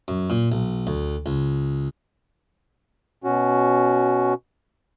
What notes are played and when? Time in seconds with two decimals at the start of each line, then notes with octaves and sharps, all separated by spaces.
0.08 F#2
0.30 A#2
0.52 B1
0.87 D2
1.26 C#2
3.24 B2 C#4 F#4